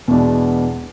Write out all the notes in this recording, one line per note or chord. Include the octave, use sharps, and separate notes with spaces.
E2 B2 G#3 B3 D4